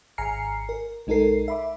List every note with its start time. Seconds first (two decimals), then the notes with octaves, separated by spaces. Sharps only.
0.18 G#1 G#5 A#5 F6 C7 C#7
0.69 A#4
1.07 B1 G#3 D#4 A4 A#4 C7
1.48 E5 B5 D6